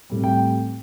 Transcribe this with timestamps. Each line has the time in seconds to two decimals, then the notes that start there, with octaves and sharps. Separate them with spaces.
0.10 A2 G3 C4
0.24 G5